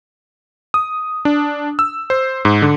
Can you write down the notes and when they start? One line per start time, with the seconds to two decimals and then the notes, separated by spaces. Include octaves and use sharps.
0.74 D#6
1.25 D4
1.79 E6
2.10 C5
2.45 G#2
2.62 D3